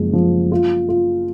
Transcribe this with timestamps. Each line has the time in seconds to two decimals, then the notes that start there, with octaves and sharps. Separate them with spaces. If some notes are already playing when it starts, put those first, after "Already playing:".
Already playing: F#1 F3 G#3
0.13 F3
0.52 F4
0.89 F4